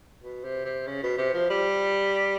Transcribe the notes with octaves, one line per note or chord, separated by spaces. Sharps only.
B2
C3
C3
C#3
B2
C3
F3
G3